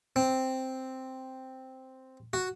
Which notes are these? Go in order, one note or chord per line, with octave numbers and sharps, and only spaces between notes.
C4
F#4